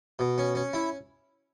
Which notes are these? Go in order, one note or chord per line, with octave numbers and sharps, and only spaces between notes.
B2
C#4
C#4
E4